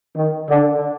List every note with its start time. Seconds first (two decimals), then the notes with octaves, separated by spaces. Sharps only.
0.16 D#3
0.50 D3